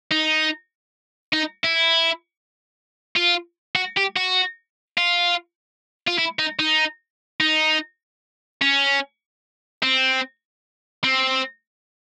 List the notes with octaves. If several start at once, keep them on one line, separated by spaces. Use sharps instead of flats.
D#4
D#4
E4
F4
F#4
G4
F#4
F4
F4
E4
D#4
D#4
D#4
C#4
C4
C4